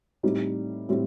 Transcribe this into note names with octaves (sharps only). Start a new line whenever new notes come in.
A2 G3 C4 D#4
A2 G3 C4